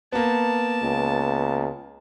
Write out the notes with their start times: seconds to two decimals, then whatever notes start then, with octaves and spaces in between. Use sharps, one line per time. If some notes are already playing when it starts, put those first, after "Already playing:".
0.12 A#3 B3 A5
0.83 C#2